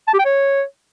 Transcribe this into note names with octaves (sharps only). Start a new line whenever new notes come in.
A5
G4
G5
C#5